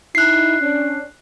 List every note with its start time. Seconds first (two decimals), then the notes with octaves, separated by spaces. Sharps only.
0.15 D#4 E4 F#6 C7
0.60 C#4 D4